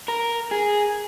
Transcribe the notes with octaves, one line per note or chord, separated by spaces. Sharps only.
A#4
G#4